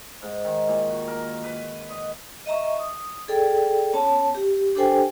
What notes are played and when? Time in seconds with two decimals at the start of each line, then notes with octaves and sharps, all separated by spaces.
0.22 G#2
0.44 D#3
0.67 A#2
0.89 F#4
1.08 A#4
1.44 B4
1.89 D#5
2.46 D#5 E5 A#5 C#6
2.79 D#6
3.28 G#4 A4 D5 G5
3.93 B3 C#4 C#5 A5
4.35 G4
4.75 D4 G4 A4 C5 G5 G#5